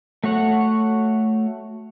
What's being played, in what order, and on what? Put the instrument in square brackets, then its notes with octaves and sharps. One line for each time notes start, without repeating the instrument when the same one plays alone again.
[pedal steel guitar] A3 F#4 C#5 F#5